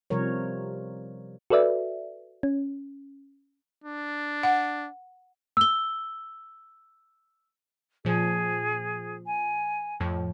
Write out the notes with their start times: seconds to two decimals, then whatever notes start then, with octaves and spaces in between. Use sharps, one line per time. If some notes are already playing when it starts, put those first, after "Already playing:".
0.10 C3 F3 G3 A#4 C#5
1.50 F#4 A4 B4 D5 E5
2.43 C#4
3.84 D4
4.43 F#5
5.57 E6 G7
8.05 A#2 F3 G#4
9.26 G#5
10.00 F2 A2 F3